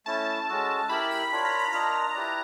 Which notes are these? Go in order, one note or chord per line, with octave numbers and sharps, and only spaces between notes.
A3 C#4 E4 A5
G#3 C#4 F#4 A4
E4 G4 A#4 B5
B5
D4 F4 A#4 C#5 B5
A#5
B5
D4 F4 A#4 D#5 A#5
E4 G4 B4 D5